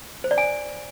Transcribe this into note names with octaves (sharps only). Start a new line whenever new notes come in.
C5
D5
G#5